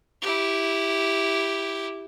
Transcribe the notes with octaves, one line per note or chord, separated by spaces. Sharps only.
E4 G4